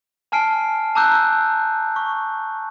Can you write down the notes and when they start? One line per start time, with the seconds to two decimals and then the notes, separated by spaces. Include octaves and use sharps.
0.32 G#5 A5 F6 C7 D7
0.95 A5 A#5 D6 E6 F#6 G6
1.96 C#6